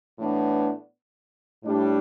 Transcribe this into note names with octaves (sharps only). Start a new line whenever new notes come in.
A2 E3 B3 D4
A2 G3 D4